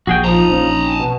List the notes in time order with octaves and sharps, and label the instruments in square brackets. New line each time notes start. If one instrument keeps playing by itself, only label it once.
[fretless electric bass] A#1 [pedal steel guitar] F#4 G#4 G5
[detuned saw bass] F3 [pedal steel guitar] D#4 [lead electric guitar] A5 A#5
[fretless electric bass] A#1 C#4
[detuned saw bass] B2